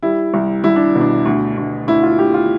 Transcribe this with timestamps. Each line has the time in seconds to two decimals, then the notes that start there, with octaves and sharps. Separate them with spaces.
0.03 G3 E4
0.34 C2
0.64 C2 E4
0.76 D4
0.95 B2
1.01 D4
1.26 D2
1.57 D2
1.88 D2 E4
2.03 F4
2.19 D2 G4
2.34 F4